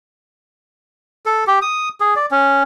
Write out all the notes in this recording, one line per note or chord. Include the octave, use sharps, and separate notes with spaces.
A4
G4
D#6
G#4
D5
C#4